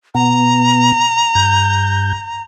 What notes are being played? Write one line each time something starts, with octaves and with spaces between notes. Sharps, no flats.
B2 B3 A#5
G2 G6